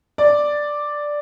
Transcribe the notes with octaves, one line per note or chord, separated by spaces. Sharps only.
D5